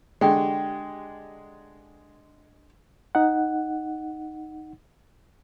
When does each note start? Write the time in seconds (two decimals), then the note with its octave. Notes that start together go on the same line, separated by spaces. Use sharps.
0.21 D3 G#3 G4 G5
3.15 D#4 F#5